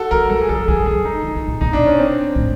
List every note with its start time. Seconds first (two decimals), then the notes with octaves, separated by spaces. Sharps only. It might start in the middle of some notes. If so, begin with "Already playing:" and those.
Already playing: F#4 A4
0.11 G3 A#4
0.30 F#3 A4
0.41 G#4
0.49 F3 A4
0.68 F#3 G#4
0.86 G#3 G#4
1.05 D#4
1.24 F3
1.35 D#3
1.48 A#2
1.61 B2 D#4
1.73 D4
1.86 C#4
1.99 C4
2.35 A2